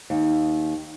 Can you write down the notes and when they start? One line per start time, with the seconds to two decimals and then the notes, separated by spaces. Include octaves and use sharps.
0.10 D#2